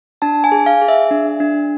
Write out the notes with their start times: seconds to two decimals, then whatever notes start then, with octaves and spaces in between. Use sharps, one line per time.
0.22 D4 A5
0.44 G#5
0.52 G#4
0.66 F5
0.82 G#4
0.88 E5
1.11 D4
1.40 D4